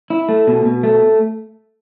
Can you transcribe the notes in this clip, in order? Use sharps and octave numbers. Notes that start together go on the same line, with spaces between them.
E4
A3
B2
B2
A3